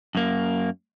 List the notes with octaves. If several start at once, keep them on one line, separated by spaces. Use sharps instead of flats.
F#2 A#3